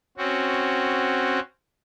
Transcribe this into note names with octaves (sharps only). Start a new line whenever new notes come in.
C4 C#4 F#4